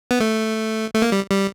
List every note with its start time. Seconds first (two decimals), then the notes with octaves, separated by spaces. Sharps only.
0.11 B3
0.20 A3
0.94 A3
1.02 A#3
1.12 G3
1.30 G3